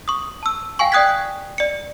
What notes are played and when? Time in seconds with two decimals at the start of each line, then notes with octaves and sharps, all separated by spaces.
0.08 C#6 D#6
0.43 A5 E6
0.79 F5 G5 G#5 C#6
0.92 D5 G5 D#6 F#6 G#6 B6
1.58 D5 C#7